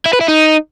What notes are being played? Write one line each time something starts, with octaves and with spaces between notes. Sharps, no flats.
E4
B4
E4
D#4